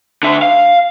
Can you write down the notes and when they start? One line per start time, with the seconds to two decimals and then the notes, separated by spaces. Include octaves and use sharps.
0.23 D3 E5
0.42 F5